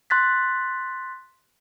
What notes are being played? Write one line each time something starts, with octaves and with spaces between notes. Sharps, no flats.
C6 F#6 A6 B6